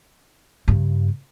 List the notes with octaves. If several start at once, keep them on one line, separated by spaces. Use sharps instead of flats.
G2 C#3